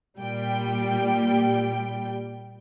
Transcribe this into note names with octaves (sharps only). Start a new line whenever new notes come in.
A#2 G3 G5